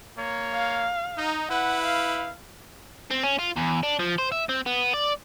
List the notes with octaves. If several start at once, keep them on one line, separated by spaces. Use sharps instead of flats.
A#3 C#5
F5
D#4
E4 B4 F#5
F5
C4
C#4
F4
E2
D4
F3
C5
E5
C4
B3
D5